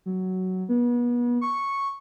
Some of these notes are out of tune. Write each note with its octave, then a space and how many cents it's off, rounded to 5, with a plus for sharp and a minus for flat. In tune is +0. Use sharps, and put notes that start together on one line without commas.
F#3 +10
B3 -35
C#6 -5